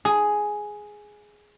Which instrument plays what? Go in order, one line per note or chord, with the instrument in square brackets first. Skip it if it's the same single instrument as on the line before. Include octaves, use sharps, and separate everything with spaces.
[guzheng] G#4